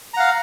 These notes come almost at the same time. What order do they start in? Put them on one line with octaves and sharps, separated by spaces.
A#5 F#5 F5